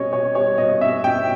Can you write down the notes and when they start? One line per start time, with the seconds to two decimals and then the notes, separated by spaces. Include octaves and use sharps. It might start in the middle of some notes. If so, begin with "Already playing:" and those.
Already playing: B2 G3 C#4 C#5 D#5
0.13 B2 C#5
0.35 G3 C#5
0.58 B2 D#5
0.81 C#4 E5
1.04 B2 G5